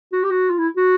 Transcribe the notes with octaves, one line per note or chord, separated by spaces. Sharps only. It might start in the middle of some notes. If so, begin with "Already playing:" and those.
F#4
G4
F#4
F4
E4
F#4